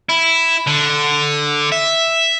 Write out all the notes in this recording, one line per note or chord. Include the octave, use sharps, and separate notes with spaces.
E4
D3
E5